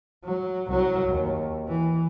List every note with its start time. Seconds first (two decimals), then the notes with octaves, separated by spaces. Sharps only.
0.24 F#3
0.67 C2 F#3
1.07 D#2
1.68 E3